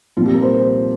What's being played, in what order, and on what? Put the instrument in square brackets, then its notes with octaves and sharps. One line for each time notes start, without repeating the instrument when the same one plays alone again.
[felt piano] C2 A#2 F3 F4
G4
A#4
C5